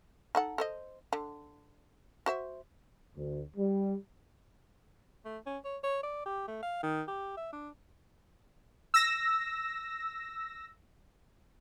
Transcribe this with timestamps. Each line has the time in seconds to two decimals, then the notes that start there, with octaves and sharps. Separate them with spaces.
0.35 D#4 A4 F#5
0.58 A4 C5 D#5
1.13 D3
2.26 F#4 C5 E5
3.16 D2
3.57 G3
5.25 A3
5.46 C#4
5.65 C#5
5.83 C#5
6.03 D5
6.26 G4
6.48 A3
6.62 F5
6.83 D#3
7.08 G4
7.37 E5
7.53 D4
8.94 E6 A#6